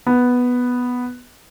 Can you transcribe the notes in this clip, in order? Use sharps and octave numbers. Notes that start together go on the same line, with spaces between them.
B3